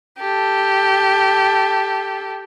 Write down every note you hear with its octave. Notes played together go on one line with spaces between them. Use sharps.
G4 A4